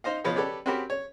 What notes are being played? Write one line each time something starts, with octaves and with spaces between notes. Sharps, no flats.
D#4 C5 D#5 F5
B2 F3 B4 C#5 F5
G4 A4 B4 C#5 D5
C4 C#4 F#4 G4 A#4 B5
C#5